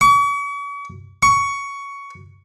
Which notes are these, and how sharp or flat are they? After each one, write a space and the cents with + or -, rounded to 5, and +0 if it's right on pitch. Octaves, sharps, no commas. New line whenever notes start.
C#6 +45
C#6 +15